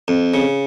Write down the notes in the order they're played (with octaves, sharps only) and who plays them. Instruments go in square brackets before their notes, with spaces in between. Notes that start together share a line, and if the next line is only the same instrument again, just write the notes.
[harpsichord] F2
C#3